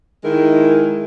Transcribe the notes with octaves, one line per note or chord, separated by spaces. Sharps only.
D#3 G#3 E4 A#4